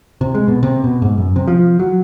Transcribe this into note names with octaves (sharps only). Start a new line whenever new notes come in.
C3
G#3
B2
C3
B2
G#2
F#2
C3
F3
F#3